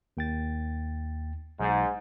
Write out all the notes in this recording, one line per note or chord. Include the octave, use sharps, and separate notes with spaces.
D#2 G5 A6
B1 G#2